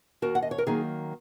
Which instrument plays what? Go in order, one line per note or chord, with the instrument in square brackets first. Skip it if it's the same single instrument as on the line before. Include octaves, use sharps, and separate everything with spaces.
[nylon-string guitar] D#2 F#4 A#4
F#5
D#5
C#5
A#4
D#3 F#3 A#3 D#4 G#4